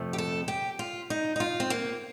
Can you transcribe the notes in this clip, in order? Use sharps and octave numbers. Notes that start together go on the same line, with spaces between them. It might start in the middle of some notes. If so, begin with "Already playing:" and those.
Already playing: F2 C3 F3 A3
G4
A4
G4
F4
D#4
D#4
F4
C4
A#3